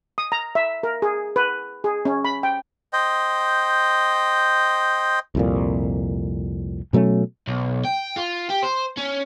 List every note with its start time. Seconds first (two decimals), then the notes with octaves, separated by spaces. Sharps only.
0.18 D#6
0.32 A#5
0.55 E5
0.83 A#4
1.02 G#4
1.36 B4
1.84 G#4
2.05 C#4
2.25 B5
2.43 G5
2.93 C5 D#5 G5
5.35 C2 F2 A#2
6.93 B2 F#3 A3 C#4
7.47 B1
7.85 G5
8.16 F4
8.50 G4
8.62 C5
8.97 C#4